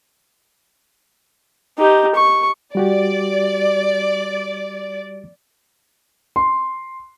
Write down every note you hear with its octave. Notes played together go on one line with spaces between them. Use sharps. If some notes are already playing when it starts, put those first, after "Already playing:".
D#4 G4
C#6
G3 F#4 G4 D5
C6